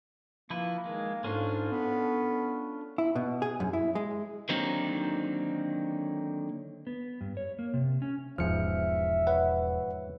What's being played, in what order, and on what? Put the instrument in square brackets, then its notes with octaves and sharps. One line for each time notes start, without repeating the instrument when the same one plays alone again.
[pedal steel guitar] F3 E4 B4 [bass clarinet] A#3
[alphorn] D#3 [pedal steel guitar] G#3
[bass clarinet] G#2 [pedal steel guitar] C#4 D4 F4 [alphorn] A4
[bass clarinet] B3
[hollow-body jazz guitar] E4
B2
G#4
F#2
E4
G#3
[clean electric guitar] D3 D#3 F#3 A#3 C4 D#4
[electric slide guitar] B3
G2
C#5
A#3
C3
C#4
[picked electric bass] E1 B3 [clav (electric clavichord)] G#2 F3 [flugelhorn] E5 [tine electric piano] F6 C#7
[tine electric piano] B4 C#5 F#5